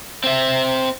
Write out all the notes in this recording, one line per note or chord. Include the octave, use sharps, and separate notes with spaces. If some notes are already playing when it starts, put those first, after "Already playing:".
C4 E5